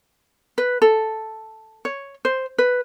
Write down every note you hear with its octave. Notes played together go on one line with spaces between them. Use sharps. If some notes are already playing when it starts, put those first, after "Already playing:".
B4
A4
C#5
C5
B4